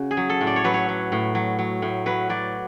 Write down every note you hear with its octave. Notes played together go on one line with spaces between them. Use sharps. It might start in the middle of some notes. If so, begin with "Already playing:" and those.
Already playing: C#3 F#4
G#4
F#3
A4
A2
D5
C#5
F#3 B4
C#5
F#3
A2
F#3
F#3
A2
F#3 B4
F#3 D5